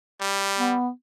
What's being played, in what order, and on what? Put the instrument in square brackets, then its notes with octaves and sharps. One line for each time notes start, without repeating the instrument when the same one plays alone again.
[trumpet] G3
[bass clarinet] B3